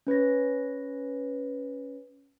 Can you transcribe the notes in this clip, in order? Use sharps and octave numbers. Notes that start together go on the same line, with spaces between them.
C#4 B4 C#5 A#6